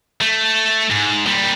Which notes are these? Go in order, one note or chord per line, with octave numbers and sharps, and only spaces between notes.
A3
G#2
A#2 G3